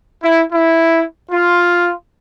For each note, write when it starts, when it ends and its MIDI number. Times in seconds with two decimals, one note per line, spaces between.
0.22 0.41 64
0.52 1.03 64
1.30 1.90 65